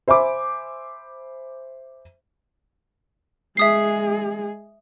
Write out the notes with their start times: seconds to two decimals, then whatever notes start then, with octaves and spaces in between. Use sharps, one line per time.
0.08 C5 E5 G#5 B5 D6
3.57 G#3 G#4 E5 D#6 C7